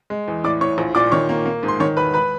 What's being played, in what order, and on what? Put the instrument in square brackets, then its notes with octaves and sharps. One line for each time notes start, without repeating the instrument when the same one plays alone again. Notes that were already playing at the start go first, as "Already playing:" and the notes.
[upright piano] G#3
E2
A2 D5 D6
A2 C#5 C#6
A#1
A#2 D5 D6
D#3 C#5 C#6
A#3
A#3
G#2
C6
D#3 C#5 C#6
E1 B4 B5
B4 B5